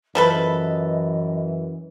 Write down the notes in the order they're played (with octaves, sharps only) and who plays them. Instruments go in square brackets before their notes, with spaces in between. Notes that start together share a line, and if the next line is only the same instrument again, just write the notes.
[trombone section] F#2 E3 [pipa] F3 A4 B4 [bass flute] D#5